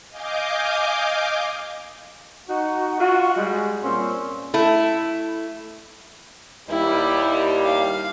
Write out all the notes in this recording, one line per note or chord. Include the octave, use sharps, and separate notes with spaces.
D#5 F5 G#5 D6 G6
D#4 F#4
F4 F#4
G3 G#3
A#2 C4 C#4 C6
A3 E4
D#2 G3 E4
F5